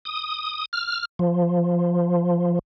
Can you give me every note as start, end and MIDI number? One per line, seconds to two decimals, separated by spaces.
0.05 0.65 87
0.73 1.05 89
1.19 2.59 53